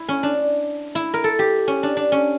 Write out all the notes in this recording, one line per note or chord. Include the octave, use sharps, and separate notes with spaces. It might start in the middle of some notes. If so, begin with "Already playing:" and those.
Already playing: E4
C#4
D4
E4
A#4
A4
G4
C#4
D4
D4
C#4